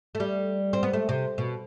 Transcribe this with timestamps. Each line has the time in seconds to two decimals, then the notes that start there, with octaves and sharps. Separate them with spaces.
0.15 A3
0.20 G3
0.73 C4
0.83 B3
0.93 A3
1.09 C3
1.38 B2